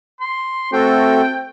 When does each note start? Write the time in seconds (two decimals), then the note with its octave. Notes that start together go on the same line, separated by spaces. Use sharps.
0.21 C6
0.73 A3 C4 F#4 A4 G5